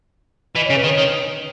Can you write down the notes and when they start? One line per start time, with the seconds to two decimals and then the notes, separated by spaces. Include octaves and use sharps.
0.55 E3 D#5
0.66 C#3 C#5
0.77 B4
0.84 D#3
0.89 C#5
0.98 D#3